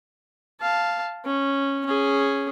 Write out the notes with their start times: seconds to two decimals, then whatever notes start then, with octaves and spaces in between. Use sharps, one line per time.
0.61 F5 A5
1.25 C#4
1.86 C#4 G#4